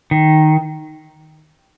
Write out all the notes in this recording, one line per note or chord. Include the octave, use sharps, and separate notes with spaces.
D#3